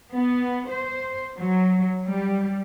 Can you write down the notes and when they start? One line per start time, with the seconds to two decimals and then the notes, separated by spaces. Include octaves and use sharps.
0.14 B3
0.71 C5
1.36 F#3
2.06 G3